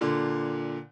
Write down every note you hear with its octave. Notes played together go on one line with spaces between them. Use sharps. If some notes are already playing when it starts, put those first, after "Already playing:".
A#2 D3